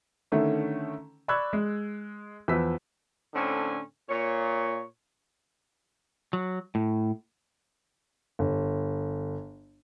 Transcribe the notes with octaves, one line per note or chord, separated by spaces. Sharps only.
D3 D#3 A3 C#4
D5 B5 C#6 E6 F#6 G#6
G#3
E2 F3 B4 E6 B6
A2 D3 C4 C#4 G#5
A#2 C#5
F#3
A2
G1